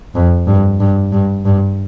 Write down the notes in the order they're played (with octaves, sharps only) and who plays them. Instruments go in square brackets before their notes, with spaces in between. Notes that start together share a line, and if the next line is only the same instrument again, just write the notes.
[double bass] F2
G2
G2
G2
G2